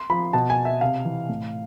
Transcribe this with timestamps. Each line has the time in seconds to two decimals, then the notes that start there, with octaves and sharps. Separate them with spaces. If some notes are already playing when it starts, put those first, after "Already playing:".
Already playing: C6
0.10 F3 B5
0.33 B2 A5
0.50 G#5
0.65 E5
0.81 C3 F5
1.05 E3
1.29 A2